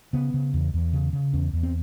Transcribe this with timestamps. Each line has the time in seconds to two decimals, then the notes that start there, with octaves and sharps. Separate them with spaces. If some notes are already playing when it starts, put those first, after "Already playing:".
0.13 C#3 B3
0.34 C#3
0.54 E2
0.74 E2
0.93 C#3
1.13 C#3
1.33 E2 C#4
1.53 E2
1.63 C4